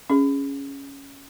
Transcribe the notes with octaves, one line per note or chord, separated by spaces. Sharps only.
C#4 G#4